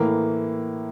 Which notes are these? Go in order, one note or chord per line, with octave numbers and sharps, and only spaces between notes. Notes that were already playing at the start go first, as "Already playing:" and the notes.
Already playing: A2 E3 A#3